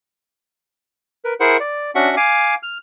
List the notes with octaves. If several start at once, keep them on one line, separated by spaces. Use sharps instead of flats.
A#4 B4
E4 G#4 A#4 C5 F#5
D5
C#4 D4 F#4 E5 F#5
F5 G#5 D6
F6